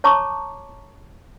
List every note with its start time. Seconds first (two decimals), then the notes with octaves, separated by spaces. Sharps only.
0.04 C#5 A5 A#5 C#6 D6